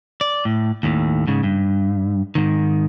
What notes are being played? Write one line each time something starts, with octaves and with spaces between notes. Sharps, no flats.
D5
A2
D#2 A2
G#2 C#3
G2
G#2 D#3